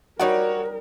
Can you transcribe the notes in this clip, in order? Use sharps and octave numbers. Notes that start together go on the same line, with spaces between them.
G3 D#4 F#4 A#4 C#5 D5